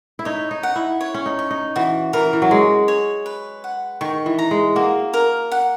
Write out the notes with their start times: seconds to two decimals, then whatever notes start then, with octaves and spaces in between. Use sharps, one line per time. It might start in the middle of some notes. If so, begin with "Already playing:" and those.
0.19 E4
0.25 D#4 C#5
0.51 D#4
0.63 F#5
0.76 E4
1.01 C#5
1.14 C#4
1.26 D#4
1.39 C#6
1.51 D#4
1.76 E3 F#4
2.13 E3 A#4
2.33 E3
2.42 F#3
2.51 G#3 G#5
2.88 C#5
3.26 B4
3.64 F#5
4.01 D#3 C#6
4.26 E3
4.39 A#5
4.51 G#3
4.76 A#3 F#4
5.14 A#4
5.52 F#5